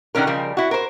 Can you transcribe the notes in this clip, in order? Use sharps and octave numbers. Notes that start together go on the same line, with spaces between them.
D3 D#3 A#3 C#4 A#4
C#3 F3 G3 A#4
E4 F#4
A#4 C5